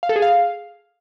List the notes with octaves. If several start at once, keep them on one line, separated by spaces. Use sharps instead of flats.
F5
A4
G#4
F5